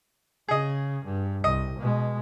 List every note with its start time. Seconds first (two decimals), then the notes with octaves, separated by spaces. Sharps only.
0.48 C#3 G#4 D#5
1.05 G2
1.44 C2 D#5
1.79 B2 G#3